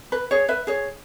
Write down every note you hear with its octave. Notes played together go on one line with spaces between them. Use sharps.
B4
G#4 C#5
B4 E5
G#4 C#5